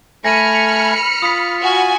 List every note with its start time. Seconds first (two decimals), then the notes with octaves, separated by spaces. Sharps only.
0.25 A3 G#5 B5 F6 A#6 C#7 D#7
1.22 F4 D#6 B6
1.61 F#4 G#5